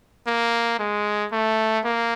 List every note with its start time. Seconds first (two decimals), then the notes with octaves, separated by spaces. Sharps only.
0.27 A#3
0.79 G#3
1.32 A3
1.85 A#3